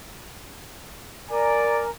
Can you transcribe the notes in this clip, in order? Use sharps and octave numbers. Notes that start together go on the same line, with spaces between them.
A#4 D5 G#5 A#5